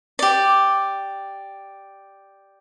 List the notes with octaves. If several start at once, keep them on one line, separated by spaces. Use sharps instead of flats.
G4 D5